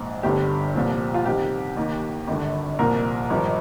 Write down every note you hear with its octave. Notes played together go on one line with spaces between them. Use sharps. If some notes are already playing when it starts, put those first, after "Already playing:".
Already playing: A#1 G#2
G1 G2 D3 G4
C2 A#2 F3
F4
C2 C3 D#3 G4
D#2 D#3
G#1 G2 D3
C2 A#2 F3 A#4
G#1 G2 F3